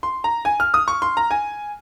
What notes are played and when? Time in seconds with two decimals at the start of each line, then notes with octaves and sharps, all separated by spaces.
0.03 C6
0.24 A#5
0.45 G#5
0.60 F6
0.74 D#6
0.88 C#6
1.02 C6
1.17 A#5
1.31 G#5